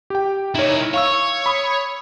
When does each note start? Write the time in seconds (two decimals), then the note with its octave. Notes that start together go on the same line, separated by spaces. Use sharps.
0.10 G4 G5
0.55 D#4 E4 A#4 C#5
0.94 C#5 F5 C#6 E6
1.46 B5 D#6